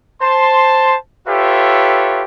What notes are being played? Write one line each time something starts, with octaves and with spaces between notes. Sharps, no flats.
C5 A5 C6
F4 G4 A4 B4 C#5 E5